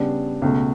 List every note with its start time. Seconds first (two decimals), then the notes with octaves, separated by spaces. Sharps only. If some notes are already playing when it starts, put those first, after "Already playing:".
Already playing: C#3 G3 B3 D4
0.42 C#2 B2 A3